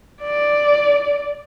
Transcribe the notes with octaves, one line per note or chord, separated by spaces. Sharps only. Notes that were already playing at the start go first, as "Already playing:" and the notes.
D5